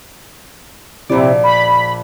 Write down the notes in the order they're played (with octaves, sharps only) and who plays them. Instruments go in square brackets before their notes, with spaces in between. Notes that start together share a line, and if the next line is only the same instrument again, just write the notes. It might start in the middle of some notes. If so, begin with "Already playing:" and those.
[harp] A#1 D5 [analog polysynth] C3 E4
[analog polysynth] B5